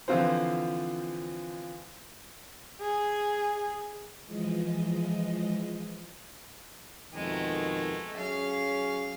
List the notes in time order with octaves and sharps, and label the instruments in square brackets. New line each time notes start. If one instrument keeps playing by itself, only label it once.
[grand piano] D3 E3 F3 C4 F4 C5
[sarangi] G#4
[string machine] E3 F3 G#3 D#5
[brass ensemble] F2 B2 D#3 [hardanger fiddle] G#3 A3
[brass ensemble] F#3 C#4 G#4 [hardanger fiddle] F5